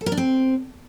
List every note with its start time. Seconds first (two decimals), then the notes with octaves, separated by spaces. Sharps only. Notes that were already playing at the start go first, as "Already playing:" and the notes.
0.01 A4
0.06 A#4
0.12 D4
0.17 C4